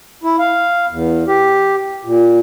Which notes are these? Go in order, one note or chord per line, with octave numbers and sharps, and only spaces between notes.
E4
F5
E2
G4
A#2